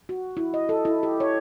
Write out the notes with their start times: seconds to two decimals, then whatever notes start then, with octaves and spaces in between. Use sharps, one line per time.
0.09 F#4
0.37 E4
0.54 D#5
0.69 A4
0.85 E4
1.03 G4
1.20 C#5